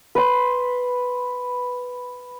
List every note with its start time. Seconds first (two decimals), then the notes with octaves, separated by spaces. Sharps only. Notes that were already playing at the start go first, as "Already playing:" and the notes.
0.15 B4 C6